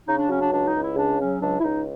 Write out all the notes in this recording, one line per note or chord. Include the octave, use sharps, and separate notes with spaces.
C#3 D#4
D4
F#3 C#4
D4
C#2 D4
D#4
C#2
E4
C#3 D4
F#3 C#4
C#2 D4
E4
C#2 D#4